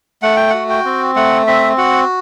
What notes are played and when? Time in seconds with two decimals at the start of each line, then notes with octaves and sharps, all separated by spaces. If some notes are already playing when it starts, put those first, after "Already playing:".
0.23 A3 F#5
0.36 G5
0.50 F#4 F#5
0.69 G5
0.85 C4
1.16 A3 F#5
1.47 C4 E5
1.78 F#4 F#5